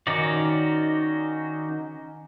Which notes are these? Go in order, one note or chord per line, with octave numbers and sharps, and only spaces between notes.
D#3 C#4 D#4 F#4 D5